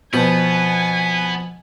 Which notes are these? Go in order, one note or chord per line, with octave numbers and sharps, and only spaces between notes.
F2 B2 B3 G5 G#5